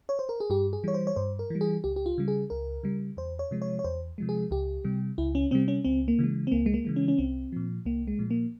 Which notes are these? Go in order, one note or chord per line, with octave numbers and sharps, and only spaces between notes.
C#5
C5
A#4
G#4
G2 G4
G#4
E3 G3 C#5
C5
C#5
G2 C5
A#4
E3 G3
G#4
C#2 G4
G4
F4
C#3 G3
G#4
C#2 A#4
C#3 G3
E2 C5
C#5
C3 F3 G#3
C#5
C#5
E2 C5
C3 F3 G#3
G#4
C#2 G4
C3 G3
C#2 E4
C#4
C3 G3 C4
C#4
C#2 C4
A#3
C#3 E3 G#3
C4
C#2 A#3
G#3
A#3
C#3 E3 G#3
C#4
C#4
C2 C4
A#2 F3
C2 A#3
G#3
A#2 F3
A#3